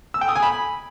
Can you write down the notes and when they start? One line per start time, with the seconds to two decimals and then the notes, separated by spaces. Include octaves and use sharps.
0.14 E6
0.21 G5
0.28 D#6
0.36 G#5
0.43 B5